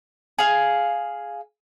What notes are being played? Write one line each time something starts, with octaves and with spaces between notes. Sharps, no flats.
G#4 F5